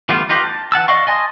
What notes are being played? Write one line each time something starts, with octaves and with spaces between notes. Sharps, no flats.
E3 G3 A3 B3 F4
D#4 F4 G4 B4
A5
E3 F#5 A5 E6
D5 D#5 F5 C#6
D#5 G#5 A5 C6 D#6